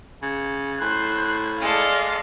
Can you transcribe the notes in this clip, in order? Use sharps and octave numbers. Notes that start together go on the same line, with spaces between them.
C#3
A2 C5 F#6
G#3 A4 D5 F5